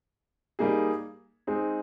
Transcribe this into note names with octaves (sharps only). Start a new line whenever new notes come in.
G3 A#3 D#4 G#4
G#3 C4 D#4 G#4